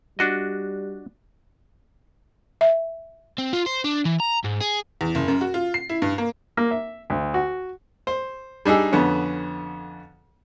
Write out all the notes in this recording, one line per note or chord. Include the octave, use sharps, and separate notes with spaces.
G3 D4 F#4 D#5
E5
C4
F4
C5
D4
E3
A#5
G#2
G#4
E2
F#1
F#2
F#4
F4
C7
E4
G2
A#3
A#3
E5
D2
F#4
C5
G3 D4 D#4 G#4 E6
F2 D3 B3 C#4